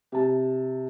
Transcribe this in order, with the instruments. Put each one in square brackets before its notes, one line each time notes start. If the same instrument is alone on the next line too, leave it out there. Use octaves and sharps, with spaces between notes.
[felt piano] C3 A5